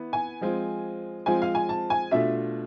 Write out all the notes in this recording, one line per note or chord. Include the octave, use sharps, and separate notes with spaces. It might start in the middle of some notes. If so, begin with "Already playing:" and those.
Already playing: E3 B3 E4
G#5
F3 G#3 C4 F4
F3 G#3 C4 F4 G#5
F5
G#5
A5
G#5
B2 A3 D4 F4 E5